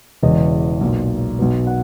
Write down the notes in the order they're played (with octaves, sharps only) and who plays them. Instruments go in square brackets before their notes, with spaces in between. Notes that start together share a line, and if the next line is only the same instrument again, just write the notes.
[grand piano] E1 E2 C#3 E3 D#5
B1 A#2
B1 B2
F#5